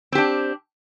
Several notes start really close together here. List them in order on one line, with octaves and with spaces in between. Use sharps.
C4 G4 D4